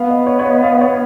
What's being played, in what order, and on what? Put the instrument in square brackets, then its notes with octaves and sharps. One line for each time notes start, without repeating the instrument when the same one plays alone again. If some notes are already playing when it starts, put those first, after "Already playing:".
Already playing: [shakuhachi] B3 [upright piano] F5
[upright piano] D#5
C#5
C#5
D#5
F5
C#5